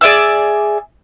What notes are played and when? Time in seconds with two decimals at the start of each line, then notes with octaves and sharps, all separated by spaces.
0.01 G#4 D5 E5 E6